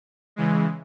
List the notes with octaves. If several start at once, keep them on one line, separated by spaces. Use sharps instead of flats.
C#3 E3 G#3